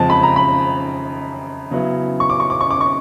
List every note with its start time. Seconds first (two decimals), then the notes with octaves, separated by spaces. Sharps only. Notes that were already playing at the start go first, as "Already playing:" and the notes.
Already playing: F2 C#3 F3 G#3 C4 A5
0.10 B5
0.23 A#5
0.36 B5
1.71 C#3 F#3 B3 E4
2.20 C#6
2.30 D6
2.40 C#6
2.50 D6
2.61 C#6
2.71 D6
2.81 C#6